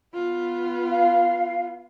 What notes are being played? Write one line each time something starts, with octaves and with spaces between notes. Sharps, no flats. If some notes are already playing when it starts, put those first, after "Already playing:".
B3 F4
F5